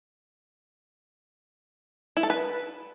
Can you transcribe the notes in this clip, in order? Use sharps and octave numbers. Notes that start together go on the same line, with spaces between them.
E4
A4
B4